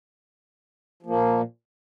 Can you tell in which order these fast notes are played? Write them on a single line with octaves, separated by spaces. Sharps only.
F3 A#3 A#2